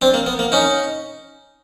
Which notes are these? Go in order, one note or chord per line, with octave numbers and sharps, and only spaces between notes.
C4 D4
A#3
B3
A#3
C#4 D#4